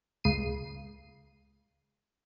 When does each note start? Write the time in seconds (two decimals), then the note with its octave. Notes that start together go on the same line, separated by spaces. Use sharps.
0.24 C#2 C7 D#7